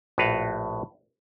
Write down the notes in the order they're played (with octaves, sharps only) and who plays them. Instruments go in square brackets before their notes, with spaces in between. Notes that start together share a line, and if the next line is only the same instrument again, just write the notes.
[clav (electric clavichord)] A#1 A2 F#4 B4 F5